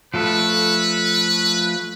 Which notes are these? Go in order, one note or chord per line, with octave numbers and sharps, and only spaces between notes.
F3 A3 A4 B4